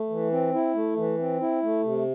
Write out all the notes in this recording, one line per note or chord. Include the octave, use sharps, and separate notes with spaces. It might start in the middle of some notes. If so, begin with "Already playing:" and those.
Already playing: A3
E3
C4
E4
A3
E3
C4
E4
A3
C3